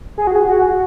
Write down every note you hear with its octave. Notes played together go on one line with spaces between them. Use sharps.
G#4
F#4
G#4
F#4